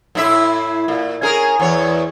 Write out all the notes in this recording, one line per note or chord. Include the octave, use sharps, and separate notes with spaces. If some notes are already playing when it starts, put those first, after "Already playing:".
A2 E4 E5
A#2
C#4 G#4 A#4
E2 C#5